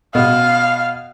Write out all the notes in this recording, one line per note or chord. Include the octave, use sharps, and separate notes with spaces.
B2 F5